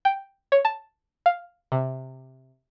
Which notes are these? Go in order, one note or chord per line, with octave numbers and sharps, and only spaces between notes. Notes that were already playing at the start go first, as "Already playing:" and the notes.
G5
C#5
A5
F5
C3